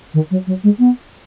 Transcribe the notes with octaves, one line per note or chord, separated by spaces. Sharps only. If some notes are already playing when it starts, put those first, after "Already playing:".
D#3
F#3
F#3
G#3
B3